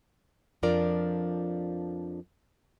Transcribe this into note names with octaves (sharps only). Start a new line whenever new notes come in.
F2 F3 D4 F4 A#4 D5